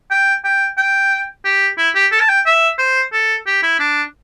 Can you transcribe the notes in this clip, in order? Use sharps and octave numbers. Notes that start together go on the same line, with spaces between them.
G5
G5
G5
G4
E4
G4
A4
A5
G5
E5
C5
A4
G4
E4
D4